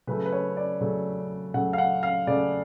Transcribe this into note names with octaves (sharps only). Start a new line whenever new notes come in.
C#3 F#3 A3 B4
B4
C#5
D5
C#3 F#3 A3
C#3 F#3 A3 F#5
F5
F#5
F5
C#3 F#3 A3 D5